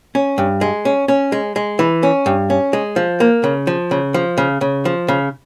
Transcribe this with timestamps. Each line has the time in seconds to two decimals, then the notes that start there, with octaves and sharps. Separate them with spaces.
0.15 C#4
0.38 G2
0.61 G#3
0.85 C#4
1.08 C#4
1.32 G#3
1.56 G#3
1.79 E3
2.03 C#4
2.26 G2
2.50 C#4
2.73 G#3
2.96 F3
3.20 A#3
3.44 C#3
3.67 F3
3.91 C#3
4.14 F3
4.38 C#3
4.61 C#3
4.85 F3
5.08 C#3